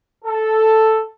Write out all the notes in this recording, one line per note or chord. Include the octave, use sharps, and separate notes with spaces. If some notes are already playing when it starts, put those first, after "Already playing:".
A4